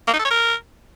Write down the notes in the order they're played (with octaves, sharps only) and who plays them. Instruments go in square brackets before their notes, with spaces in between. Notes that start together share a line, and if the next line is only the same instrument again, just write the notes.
[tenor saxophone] A#3
D#4
A4
C#5
A#4